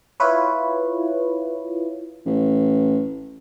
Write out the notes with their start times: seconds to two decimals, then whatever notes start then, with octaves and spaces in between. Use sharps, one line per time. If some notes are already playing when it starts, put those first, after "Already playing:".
0.20 E4 F4 B4 C#5
2.26 A1